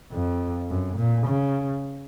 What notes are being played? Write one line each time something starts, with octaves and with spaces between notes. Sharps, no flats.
F2
F#2
A#2
C#3